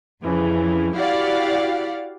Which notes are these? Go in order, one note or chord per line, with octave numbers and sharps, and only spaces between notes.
F2 C#3 E3
E4 F#4 G4 D5 F5 F#5